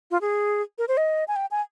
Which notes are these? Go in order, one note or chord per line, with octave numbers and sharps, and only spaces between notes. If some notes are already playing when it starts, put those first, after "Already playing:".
F4
G#4
A#4
C5
D#5
G#5
G5
G#5